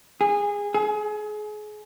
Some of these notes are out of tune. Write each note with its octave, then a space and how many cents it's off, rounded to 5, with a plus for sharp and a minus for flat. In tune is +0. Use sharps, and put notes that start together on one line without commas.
G#4 -20
G#4 +30